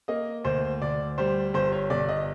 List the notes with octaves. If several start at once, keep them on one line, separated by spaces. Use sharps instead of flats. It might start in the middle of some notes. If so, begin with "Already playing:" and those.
A#3 D#5
D2 C5
D2 D5
G3 C5
G1 C5
C#5
G1 D5
D#5